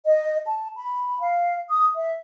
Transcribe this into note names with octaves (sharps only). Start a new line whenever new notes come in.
D#5
A5
B5
F5
D#6
E5